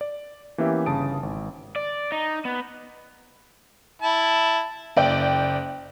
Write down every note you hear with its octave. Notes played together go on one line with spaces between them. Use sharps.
D5
E3 A#3 B3 C#4 G4 E5
G1 C#3 A5 D#6 D7
G#1
D5
D#4
B3
E4 A5
F#1 D5 G5